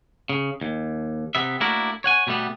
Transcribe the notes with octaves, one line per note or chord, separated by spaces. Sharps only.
C#3
D#2
C3 B3 E5
A3 A#3 D4 E4 F#4 A#4
C#5 F#5 G#5
B2 G3 A3 B3